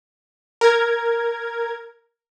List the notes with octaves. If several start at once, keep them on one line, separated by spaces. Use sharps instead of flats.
A#4 G#6